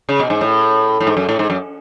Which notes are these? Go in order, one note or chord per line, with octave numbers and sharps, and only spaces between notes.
C#3
B2
G#2
A2
A2
G#2
F#2
A2
G#2
F#2